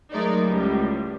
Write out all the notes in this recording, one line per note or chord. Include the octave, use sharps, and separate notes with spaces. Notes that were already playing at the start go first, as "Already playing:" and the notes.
F#3 G#3 A3 D#4 A#4 D5
C#2 A2 G3